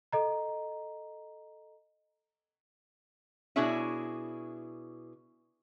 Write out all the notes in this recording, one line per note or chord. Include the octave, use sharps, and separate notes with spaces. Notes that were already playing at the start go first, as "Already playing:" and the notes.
A4 D#5 A#5
B2 D4 E4 G#4 C#5 E5